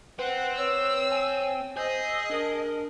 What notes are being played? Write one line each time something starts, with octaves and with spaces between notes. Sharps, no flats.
C4 B4 F#5
C#5 E6
G#5
G#4 C5 D#5 E6
D4 A#4